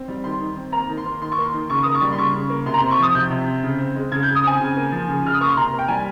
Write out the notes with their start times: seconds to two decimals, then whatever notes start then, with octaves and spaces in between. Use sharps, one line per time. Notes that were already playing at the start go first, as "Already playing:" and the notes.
Already playing: C4
0.08 G3
0.24 D#3 C6
0.40 D#3
0.56 C4
0.72 A#3 A#5
0.89 D#3
0.97 C6
1.06 A#3
1.21 D#3 C6
1.32 C#6
1.38 A#3 C6
1.53 D#3
1.70 C#3 C#6
1.83 A#3 D#6
1.95 C#6
2.01 G3
2.12 C6
2.18 C#3 C#6
2.33 C#3
2.50 A#3
2.66 C3 C6
2.74 A#5
2.78 C6
2.82 C4
2.91 C#6
2.99 F3 D#6
3.15 C3 G6
3.30 C3
3.48 C4
3.63 C#3
3.79 C4
3.95 G#3
4.12 C#3 G#6
4.23 G6
4.27 C#3
4.35 D#6
4.43 C4 G#5
4.60 C#3
4.77 A#3
4.92 F3
5.08 C#3
5.24 C#3 F6
5.34 D#6
5.40 A#3 C#6
5.49 C6
5.57 C3 A#5
5.73 A#3
5.79 G5
5.88 G3 G#5